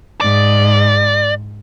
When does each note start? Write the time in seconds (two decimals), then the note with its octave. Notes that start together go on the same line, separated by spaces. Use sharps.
0.21 G#2 D5